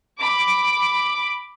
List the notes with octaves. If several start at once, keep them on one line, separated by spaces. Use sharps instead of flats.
B5 D6